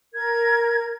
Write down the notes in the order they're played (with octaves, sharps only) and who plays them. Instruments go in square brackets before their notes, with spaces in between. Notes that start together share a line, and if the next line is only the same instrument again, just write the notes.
[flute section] A#4 G#6